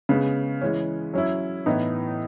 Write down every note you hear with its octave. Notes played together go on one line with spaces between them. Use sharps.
C#3 G#3 B3
E3 G#3 C#4
F#3 C#4 E4
A2 E3 B3 D#4